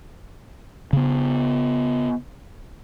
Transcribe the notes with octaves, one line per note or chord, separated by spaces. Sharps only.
C#3 B3